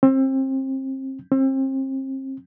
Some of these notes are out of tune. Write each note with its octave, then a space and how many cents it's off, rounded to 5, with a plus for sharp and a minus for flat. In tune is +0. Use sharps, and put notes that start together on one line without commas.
C4 +30
C4 +35